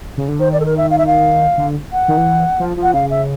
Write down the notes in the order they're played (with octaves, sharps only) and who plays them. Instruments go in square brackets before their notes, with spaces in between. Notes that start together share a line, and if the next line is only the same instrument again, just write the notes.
[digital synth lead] C#3
D3
[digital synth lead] D#3 [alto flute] C5
[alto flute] D5
A4
A#4
E5
F5
E5
F5
[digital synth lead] D3
[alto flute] F#5
[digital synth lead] D#3
E3
F3
F3
[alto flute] F#5
[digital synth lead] C#3 [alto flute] F5
[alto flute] E5